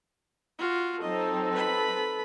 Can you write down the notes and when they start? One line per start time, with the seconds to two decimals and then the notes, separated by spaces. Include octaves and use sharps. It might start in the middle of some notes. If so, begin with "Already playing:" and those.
0.59 F4 F#4
1.02 F#3 C4 D#4 A4 D#5
1.52 B4 B5